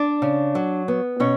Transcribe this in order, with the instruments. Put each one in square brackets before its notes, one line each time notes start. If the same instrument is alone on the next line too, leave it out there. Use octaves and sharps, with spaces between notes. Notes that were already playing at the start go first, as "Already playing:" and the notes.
Already playing: [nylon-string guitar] D4 D5
C#3
F#3
B3
B2 C#4 C#5